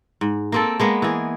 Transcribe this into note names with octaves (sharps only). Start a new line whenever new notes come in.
G#2
A#3 C4 A4
G#3 A#3 B3
E3 G#4